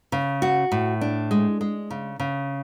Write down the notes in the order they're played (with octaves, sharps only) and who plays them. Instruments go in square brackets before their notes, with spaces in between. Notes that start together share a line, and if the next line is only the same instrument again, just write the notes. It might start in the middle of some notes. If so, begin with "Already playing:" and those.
[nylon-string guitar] C#3
F#4
A2
D4
G#3
G#3
C#3
C#3